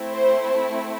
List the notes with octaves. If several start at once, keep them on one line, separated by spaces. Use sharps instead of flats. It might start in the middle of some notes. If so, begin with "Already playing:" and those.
Already playing: A3 C4 E4
C5